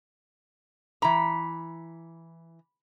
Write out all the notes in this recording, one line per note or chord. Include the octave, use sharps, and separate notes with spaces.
E3 A#5 B5